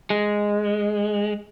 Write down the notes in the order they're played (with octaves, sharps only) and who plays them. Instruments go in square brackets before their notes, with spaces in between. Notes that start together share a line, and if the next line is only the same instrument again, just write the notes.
[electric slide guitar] G#3